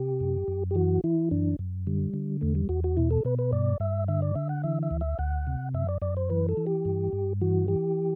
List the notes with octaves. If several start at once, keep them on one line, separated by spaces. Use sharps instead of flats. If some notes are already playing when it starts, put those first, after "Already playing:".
Already playing: C3 G4
F#2
F#2
G4
E3 F#4
E3 E4
F#2 D4
F#2
D3 G3
D3
E2 A3
G3
E2 F#4
F#4
B2 E4
A4
B2 B4
B4
G2 D5
G2 E5
D3 E5
D5
D3 E5
F#5
E3 E5
E5
D2
E5
D2 F#5
C3
F#2 E5
D5
F#2 D5
C5
E3 B4
A4
E3
G4
G2
G2
E3 F#4
E3 G4